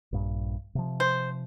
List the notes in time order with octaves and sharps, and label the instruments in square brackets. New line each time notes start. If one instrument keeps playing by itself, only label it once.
[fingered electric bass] A#1 G2
C3 F3
[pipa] C5